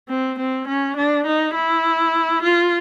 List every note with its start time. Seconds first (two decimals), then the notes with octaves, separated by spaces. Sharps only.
0.09 C4
0.39 C4
0.67 C#4
0.96 D4
1.26 D#4
1.55 E4
2.43 F4